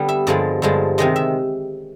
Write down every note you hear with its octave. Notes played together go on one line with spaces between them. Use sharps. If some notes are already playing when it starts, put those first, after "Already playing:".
Already playing: D3 G3 B3
E5
G2 D3 F3 G#3 D5
G2 D3 F3 G#3
C3 D#3 G#3 D#5
E5